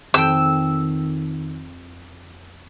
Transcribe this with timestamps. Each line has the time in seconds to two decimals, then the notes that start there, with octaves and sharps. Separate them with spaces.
0.14 F2 D#3 G5 E6